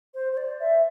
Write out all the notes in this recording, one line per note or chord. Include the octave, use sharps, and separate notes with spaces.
C5
C5
D5
E5